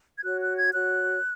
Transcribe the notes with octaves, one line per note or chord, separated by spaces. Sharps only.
G#6
F#4 C#5 F#6
F#6
G#6
F#4 C#5 F#6